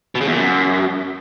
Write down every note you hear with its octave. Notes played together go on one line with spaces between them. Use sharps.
B2
C#3
E2
A#2
F#2